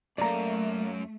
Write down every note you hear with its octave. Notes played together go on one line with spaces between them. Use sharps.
F#2 A3 A#3 D5 A#5